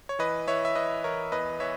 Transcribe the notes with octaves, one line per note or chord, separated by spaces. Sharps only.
C#5
E3 B4 D#5
E3 C#5 E5
E5
E3 B4 D#5
E3 A#4 C#5
E2 B4 D#5
E3 C#5 E5